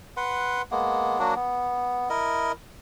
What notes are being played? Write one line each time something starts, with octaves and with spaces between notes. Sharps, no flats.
B4 F#5 C6
G#3 A#3 B3
F#3 A#3 D4 F#4
B3
E4 A#4 D#5